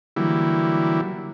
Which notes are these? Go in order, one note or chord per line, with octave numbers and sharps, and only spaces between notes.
D3 E3 F#3 G3 A#3 E4